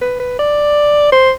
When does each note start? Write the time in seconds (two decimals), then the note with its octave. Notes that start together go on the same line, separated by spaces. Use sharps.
0.01 B4
0.20 B4
0.39 D5
1.12 C5